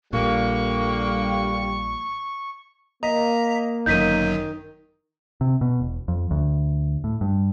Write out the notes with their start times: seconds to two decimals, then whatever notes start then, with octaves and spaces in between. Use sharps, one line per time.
0.13 A#1 A#2 D3 G3 A#3 C#6
3.03 A#3 D#5 A#5 B6
3.86 G1 F#2 D#3 F#3 D#4 G6 B6 D#7
5.41 C3
5.61 B2
5.80 E1
6.08 F2
6.31 D2
7.04 A2
7.21 G2